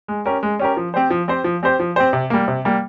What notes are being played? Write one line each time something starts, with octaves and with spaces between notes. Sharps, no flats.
G#3
C#4 G4 A#4
G#3
C#4 G4 A#4
F3
C4 G4 C5
F3
C4 G4 C5
F3
C4 G4 C5
F3
C4 G4 C5
C3
G3 A#3
C3
G3 A#3